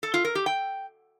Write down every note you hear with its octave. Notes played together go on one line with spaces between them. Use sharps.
A4
F4
A#4
G4
G5